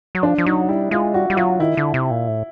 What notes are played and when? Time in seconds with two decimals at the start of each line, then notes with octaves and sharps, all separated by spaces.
0.15 F#3
0.23 F3 D4
0.38 F3
0.46 F#3 D#4
0.69 G3 E4
0.91 G#3 F4
1.14 G3 F#4
1.30 G3
1.37 F#3 F4
1.59 D#3 E4
1.77 D3
1.94 C3
2.11 A#2
2.28 A2